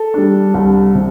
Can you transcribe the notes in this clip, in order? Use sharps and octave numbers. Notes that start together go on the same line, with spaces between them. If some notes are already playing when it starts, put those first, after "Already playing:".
Already playing: A4
G3 D4
C2
C3